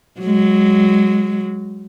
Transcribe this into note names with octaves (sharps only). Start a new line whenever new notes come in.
F#3 G#3